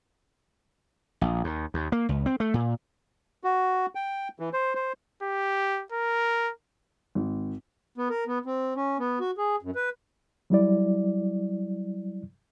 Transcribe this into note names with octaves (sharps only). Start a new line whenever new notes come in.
A#1
D#2
D#2
A#3
C#2
C4
A3
A#2
F#4
G5
E3
C5
C5
G4
A#4
G#1
B3
A#4
B3
C4
C#4
B3
F#4
G#4
F#2
B4
F#3 G3 E4 D5